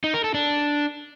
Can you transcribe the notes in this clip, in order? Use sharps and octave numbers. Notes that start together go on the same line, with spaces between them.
D#4
A#4
A4
D4